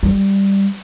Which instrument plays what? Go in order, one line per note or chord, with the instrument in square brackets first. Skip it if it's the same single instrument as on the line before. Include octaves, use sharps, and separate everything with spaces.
[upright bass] G3